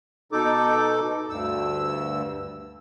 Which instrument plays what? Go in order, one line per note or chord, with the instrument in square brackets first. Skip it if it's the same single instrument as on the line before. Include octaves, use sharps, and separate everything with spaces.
[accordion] B2 D#4 A4 D6
D2 G2 E6